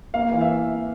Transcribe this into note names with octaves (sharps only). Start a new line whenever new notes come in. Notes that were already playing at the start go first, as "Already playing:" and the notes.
A#3 F5
E3
E5